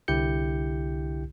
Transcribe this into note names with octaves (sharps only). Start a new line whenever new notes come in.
C2 D3 E4 G4 G6 C#7